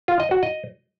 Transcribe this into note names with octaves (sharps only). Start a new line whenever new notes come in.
F4
D#5
F#4
D#5